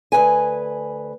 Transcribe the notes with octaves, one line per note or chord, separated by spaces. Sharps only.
D2 B2 B4 G#5